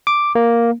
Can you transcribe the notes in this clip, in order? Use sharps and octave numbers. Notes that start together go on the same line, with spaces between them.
D6
A#3